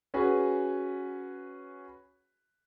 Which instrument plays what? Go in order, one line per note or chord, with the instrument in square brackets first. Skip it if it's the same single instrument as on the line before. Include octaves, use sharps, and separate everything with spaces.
[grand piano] C#4 F#4 G#4 B4